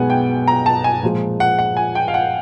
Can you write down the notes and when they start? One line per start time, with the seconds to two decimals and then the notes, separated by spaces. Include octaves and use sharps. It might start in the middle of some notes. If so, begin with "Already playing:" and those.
Already playing: B1 B2 G#3 B3 F#5 G#5
0.10 G5
0.48 A#5
0.66 A5
0.84 G#5
1.03 A#2 F3 G#3
1.40 F#5
1.59 F#5
1.77 G#5
1.95 G5
2.08 F5
2.14 F#5